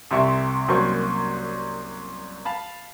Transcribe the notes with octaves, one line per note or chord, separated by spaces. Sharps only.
C2 C3 E5 C#6
C2 F#2 F#3 A#3 C5 C#6
F5 A5 B5